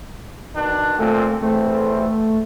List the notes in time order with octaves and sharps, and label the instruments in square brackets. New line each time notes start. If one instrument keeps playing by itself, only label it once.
[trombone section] B2 D#3 D4
[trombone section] A#2 C4 A4 [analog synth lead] A3
[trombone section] E2 C4 [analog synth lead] A3